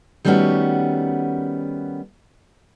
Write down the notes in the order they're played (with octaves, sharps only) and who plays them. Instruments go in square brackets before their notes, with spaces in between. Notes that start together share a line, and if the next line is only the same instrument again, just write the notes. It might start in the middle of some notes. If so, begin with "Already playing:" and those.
[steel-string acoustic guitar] D#3 G3 A3 B3 C#4 F#4